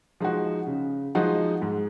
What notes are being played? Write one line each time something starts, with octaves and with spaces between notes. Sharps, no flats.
F3 G#3 D#4 F#4
C#3
F3 G#3 D#4 F#4
G#2